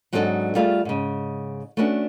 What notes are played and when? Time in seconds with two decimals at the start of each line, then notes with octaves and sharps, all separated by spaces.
0.13 G#2 F#3 C4 D4 D#4 A4
0.55 G3 A3 F4 G#4 A4 F5
0.85 G#2 C#3
1.77 A3 B3 C#4 D4 F#4